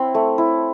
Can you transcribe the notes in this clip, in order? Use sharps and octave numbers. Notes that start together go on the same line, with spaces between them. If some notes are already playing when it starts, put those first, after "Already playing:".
Already playing: C4 E4 F#5
A3
E4